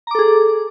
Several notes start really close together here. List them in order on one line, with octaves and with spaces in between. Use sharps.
A#5 D6 A4 G#4